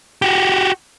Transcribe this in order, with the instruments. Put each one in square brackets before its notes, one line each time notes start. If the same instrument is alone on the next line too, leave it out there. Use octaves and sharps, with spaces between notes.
[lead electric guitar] F#4 G4